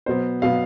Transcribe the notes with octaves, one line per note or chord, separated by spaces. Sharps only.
B2 F#3 B3 C5
B2 F#3 B3 F5